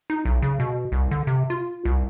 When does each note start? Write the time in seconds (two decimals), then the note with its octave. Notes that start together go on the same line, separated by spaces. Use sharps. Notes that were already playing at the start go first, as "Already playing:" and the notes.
0.10 D#4
0.25 B1
0.42 C#3
0.60 B2
0.92 C2
1.11 D3
1.27 C3
1.50 F4
1.85 C2